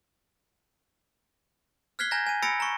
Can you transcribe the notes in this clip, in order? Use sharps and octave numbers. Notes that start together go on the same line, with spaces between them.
F6 F#6 G#6 B6 C7 G7
G#5 A#5 G6 G#6 A#6
G#5 D#7
B5 E6 A6 A#6 C#7 D7
A#5 C#6